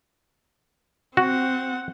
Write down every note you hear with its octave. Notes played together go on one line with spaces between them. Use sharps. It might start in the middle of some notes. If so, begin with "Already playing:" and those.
C4 F#4 F#5